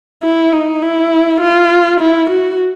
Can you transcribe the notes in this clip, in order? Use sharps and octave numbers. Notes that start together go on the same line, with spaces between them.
E4
D#4
E4
F4
E4
F#4